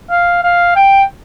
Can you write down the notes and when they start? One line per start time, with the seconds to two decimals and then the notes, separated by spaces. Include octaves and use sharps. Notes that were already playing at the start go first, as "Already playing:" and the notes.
0.10 F5
0.44 F5
0.76 G5